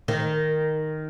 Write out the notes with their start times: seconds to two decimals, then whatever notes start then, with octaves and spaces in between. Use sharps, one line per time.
0.08 D#3